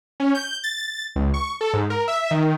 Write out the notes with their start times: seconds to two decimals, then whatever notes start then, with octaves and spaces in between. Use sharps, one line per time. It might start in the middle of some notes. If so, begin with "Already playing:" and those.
0.20 C#4
0.35 G6
0.64 A6
0.82 A6
1.16 C#2
1.34 C#6
1.61 A4
1.73 G#2
1.90 A#4
2.08 E5
2.31 D#3